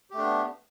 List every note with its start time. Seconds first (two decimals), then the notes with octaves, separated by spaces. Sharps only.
0.10 G4
0.14 A3
0.18 D4
0.22 B3